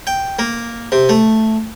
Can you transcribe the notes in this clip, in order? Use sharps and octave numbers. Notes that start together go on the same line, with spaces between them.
G5
A#3
C3
A3